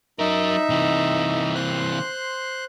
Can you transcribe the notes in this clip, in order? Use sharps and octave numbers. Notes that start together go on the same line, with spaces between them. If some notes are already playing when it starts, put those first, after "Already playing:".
F#3 D#4 A#4 E5
C3 E3
C5 C6 F#6